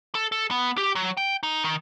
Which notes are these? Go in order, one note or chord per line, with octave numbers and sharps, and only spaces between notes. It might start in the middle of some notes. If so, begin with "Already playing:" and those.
A4
A4
B3
G4
F#3
G5
D#4
D#3